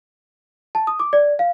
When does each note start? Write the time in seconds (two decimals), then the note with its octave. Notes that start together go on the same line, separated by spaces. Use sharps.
0.75 A5
0.87 D#6
1.00 D6
1.13 D5
1.39 F5